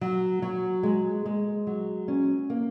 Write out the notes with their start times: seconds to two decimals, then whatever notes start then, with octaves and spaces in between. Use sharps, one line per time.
0.01 F#3
0.42 F#3
0.83 G#3
1.26 G#3
1.67 F#3
2.08 C#4
2.50 A#3